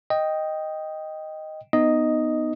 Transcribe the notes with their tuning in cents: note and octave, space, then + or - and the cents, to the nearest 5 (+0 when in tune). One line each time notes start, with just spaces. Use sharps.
D#5 +0 G5 +0
B3 +5 D#4 -10 D#5 +0